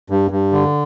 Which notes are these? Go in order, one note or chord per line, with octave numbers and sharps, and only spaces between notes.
G2
G2
D3